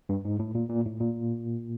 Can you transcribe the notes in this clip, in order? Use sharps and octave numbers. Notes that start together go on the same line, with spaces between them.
G2
G#2
A2
A#2
A#2
A2
A#2